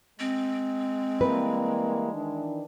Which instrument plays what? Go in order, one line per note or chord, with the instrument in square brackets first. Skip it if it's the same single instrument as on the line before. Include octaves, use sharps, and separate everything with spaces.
[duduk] G#3 [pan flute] C4
[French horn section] E3 G3 A#3 [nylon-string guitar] B4
[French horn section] D#3 E3 D4